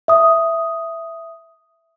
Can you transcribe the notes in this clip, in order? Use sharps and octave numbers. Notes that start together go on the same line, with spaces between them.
E5 D#6